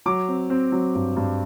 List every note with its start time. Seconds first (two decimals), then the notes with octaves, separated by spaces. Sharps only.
0.06 F#3 D6
0.28 C4
0.50 C4
0.72 F#3
0.95 G2
1.16 G2